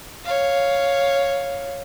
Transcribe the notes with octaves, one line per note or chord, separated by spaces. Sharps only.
C#5 F5